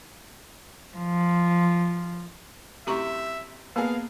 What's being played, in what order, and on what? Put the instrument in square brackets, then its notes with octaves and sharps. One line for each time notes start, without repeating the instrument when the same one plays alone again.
[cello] F3
[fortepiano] F#2 A2 C3 [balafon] G4 A#5 C#6 [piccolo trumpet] E5
[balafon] A#3 [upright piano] B3 [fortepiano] G#4 A#4 A5 [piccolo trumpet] F5